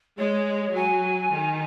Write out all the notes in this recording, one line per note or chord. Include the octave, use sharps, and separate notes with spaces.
G#3 C#5
F#3 G#5
D#3